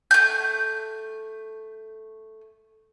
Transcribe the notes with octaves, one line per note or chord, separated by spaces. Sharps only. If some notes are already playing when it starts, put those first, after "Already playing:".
A3 G6